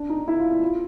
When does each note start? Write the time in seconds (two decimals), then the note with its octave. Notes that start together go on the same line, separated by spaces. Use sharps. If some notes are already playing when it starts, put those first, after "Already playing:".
Already playing: D4
0.10 D#4
0.28 E4
0.39 F4
0.51 E4
0.62 F4